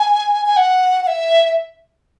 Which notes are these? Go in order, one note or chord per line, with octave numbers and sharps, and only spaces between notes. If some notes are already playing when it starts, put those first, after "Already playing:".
Already playing: G#5
G#5
F#5
F#5
E5